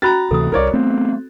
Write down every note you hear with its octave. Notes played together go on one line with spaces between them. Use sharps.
C#4 F#4 A#5 B5 F#6 A6
D2 C3 E3 A4 D#6
D1 C2 A#4 C#5 D5
A3 B3 C4